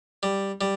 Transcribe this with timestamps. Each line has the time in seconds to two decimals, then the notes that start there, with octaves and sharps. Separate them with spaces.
0.23 G3
0.61 G3